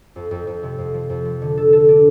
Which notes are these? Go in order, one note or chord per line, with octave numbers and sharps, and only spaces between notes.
F2
F2
F2
C3
F2
F3
F2
F3
D3
A4
A4
D4